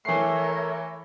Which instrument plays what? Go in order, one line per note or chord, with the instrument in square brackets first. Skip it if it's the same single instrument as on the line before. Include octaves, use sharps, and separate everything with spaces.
[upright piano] E3 C7 [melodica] A3 [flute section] A#4 C#5 E5